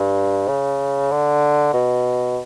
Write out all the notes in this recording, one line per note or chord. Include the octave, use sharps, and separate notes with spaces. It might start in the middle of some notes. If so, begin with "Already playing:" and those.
Already playing: G2
C#3
D3
B2